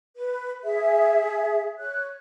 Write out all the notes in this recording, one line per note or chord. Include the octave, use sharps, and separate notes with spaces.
B4
G#4 E5
C#5 F#6